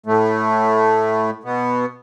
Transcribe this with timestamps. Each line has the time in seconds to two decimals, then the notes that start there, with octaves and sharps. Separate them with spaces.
0.06 A2 A3
1.44 B2 B3